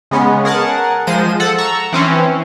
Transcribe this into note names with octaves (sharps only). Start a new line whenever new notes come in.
C#3 G#3 B3 C#4
G#4 A#4 F#5 A5
F3 G#3 C5 D#7
A4 F#5
A#5 C#6 E6
E3 C4 C#4